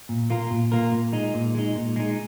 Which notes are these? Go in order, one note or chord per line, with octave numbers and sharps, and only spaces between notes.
A#2
A#3 F4 A#4
A#2
A#3 F4 A#4
A#2
G#3 D#4
A#2
G#3 D#4
A#2
G#3 D#4